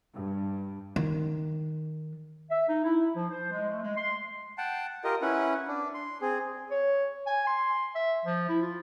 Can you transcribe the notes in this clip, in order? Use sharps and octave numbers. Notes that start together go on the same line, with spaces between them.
G2
D#3
E5
D#4
E4
F3
C5
G#3
A3
G#3
C6
F#5 G5 A5
F4 G4 A#4 D#5
C#4 E4 B4 F#5
D4
C6
C4 G#4
C#5
G#5
C6
E5
F3
E4
F4